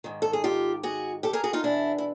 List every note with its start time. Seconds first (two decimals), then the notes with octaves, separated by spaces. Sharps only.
0.04 G#2 D#3
0.22 A4
0.33 G#4
0.44 F4 G4
0.83 F#4 G#4
1.23 G4 A4
1.33 G#4 A#4
1.44 F#4 G#4
1.53 D#4 F4
1.63 E2 B2 D4 E4
1.98 E4